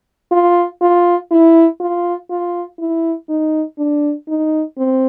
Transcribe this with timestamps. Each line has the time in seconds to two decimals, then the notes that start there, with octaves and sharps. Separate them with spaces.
0.31 F4
0.81 F4
1.31 E4
1.80 F4
2.30 F4
2.79 E4
3.29 D#4
3.78 D4
4.28 D#4
4.78 C4